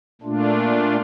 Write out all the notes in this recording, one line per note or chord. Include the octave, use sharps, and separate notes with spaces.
A#2 A3 D4 F4